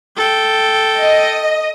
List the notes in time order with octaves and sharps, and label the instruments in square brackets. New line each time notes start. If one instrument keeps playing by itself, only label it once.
[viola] A4 G5
[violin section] D#5